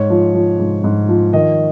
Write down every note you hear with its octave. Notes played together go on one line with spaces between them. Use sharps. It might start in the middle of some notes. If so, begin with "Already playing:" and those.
Already playing: G#2 C#5
F3
F3
G#2
G#2
F3
D#3 D#5